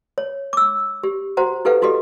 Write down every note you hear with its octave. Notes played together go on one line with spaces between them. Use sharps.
C#5
D6 E6
G4
F#4 C5 F#5 A#5
E4 G4 A4 B4 F5 F#5
E4 F#4 G4 A4 D#5